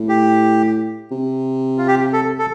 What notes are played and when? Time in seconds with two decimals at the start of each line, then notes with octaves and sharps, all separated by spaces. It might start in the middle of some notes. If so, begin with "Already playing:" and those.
Already playing: A2
0.09 G4
1.11 C3
1.78 F4
1.88 G4
2.13 A4
2.39 A4